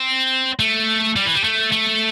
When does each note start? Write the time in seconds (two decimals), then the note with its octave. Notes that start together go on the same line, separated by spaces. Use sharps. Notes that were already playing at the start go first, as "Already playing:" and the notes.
Already playing: C4
0.60 A3
1.16 G3
1.26 E3
1.35 G3
1.44 A3
1.72 A3